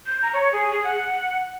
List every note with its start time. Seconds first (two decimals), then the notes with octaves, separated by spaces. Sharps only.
0.06 G6
0.22 A#5
0.34 C#5
0.53 G#4
0.72 G#4
0.84 F#5